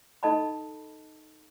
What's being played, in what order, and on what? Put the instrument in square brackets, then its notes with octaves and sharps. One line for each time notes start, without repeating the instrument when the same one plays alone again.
[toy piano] D#4 A4 D#5 A5 B5